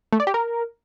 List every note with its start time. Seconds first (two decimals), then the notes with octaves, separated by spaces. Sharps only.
0.13 A3
0.20 D5
0.27 G4
0.34 A#4